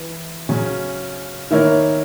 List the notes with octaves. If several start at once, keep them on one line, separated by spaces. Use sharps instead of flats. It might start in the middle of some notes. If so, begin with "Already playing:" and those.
Already playing: E3
C#3 F#3 C#4
D#3 A#3 E4 A#4 C#5